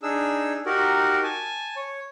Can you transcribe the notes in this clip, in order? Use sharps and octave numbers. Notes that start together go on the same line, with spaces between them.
D4 D#4 G#4 E6
D#4 F#4 G4 A#4
G#5 A5
C#5